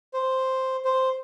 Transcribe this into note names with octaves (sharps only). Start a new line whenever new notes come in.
C5
C5